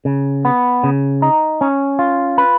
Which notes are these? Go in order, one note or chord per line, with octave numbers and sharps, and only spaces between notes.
C#3
B3
C#3
D#4
C#4
F4
B4